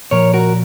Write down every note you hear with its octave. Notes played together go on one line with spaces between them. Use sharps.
A#2 F3 A#4 C#5
F#4 A#4